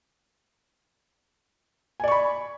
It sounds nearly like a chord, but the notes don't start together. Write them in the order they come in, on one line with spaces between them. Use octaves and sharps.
G#5 D5 C#6 B5